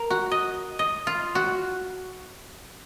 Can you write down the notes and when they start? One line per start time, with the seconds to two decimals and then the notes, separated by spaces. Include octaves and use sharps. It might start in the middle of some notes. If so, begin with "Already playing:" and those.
Already playing: A#4
0.10 F#4
0.31 D#5
0.79 D#5
1.07 F4
1.35 F#4